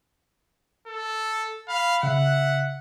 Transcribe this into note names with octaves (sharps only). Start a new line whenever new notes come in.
A4
F5 B5
C#3 E5 F#5